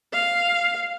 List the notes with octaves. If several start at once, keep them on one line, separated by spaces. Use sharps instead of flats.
F5